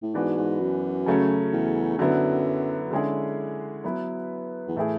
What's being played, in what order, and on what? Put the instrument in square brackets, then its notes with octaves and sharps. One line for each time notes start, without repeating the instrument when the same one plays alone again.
[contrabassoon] A2
[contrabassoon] G#2 [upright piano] E3 B3 D4 F#4 B4
[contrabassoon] G#2
F#2
[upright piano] C#3 F#3 A3 C#4
[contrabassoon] E2
[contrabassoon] F#2 [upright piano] D3 F#3 B3 E4
[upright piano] D3 G#3 C#4 E4 G#4
F#3 B3 E4 B4
[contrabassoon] E2
[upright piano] A2 E3 A3 E4 G#4